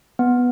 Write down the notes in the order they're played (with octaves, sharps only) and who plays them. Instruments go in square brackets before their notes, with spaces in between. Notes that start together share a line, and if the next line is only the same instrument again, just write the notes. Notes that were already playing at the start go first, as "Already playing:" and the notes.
[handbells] B3